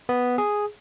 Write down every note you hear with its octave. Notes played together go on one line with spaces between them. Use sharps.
B3
G#4